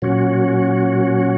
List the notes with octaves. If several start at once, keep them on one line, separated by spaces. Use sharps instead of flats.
A#2 F#3 C#4 F#4